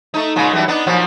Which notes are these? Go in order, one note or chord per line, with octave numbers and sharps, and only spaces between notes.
A3 D#4
A#2 C#3 G#3
F#2 E3 G3
B3 D4 D#4
A#2 F3 F#3